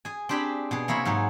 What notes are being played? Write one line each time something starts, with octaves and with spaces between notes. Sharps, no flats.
G#4 G#5
C4 D4 G4 G#4 B5
B2 G#4
C3 A#3 E4 C#5 B5
G#2 F#3 F#4 G#4